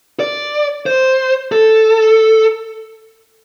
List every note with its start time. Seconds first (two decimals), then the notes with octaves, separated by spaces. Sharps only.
0.20 D5
0.86 C5
1.52 A4